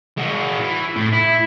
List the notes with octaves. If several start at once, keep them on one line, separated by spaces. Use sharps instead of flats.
G#3 F#4
E3
A2
E4